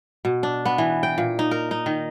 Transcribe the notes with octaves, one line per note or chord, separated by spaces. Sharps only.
B2
D4
B3
E3
G5
A#2
D#4
A#4
D#4
D#3